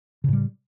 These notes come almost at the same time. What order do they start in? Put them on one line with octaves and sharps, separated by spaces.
C#3 A2 G3